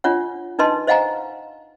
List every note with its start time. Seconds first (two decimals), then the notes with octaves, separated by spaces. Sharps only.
0.04 D4 F4 C#5 F#5
0.59 D4 D#4 B4 D#5 A5 C6
0.87 C5 D#5 F5 F#5 G#5 A#5